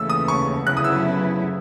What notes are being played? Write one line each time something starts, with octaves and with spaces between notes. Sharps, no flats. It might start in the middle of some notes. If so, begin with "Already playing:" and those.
Already playing: D#2 C#3 E3 A3 E6
D#6
C#6
D2 C#3 F#3 B3 E4 F#6
D#6
E6